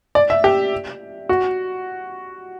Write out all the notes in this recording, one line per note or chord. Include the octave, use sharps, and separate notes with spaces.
D5
E5
G4
F#4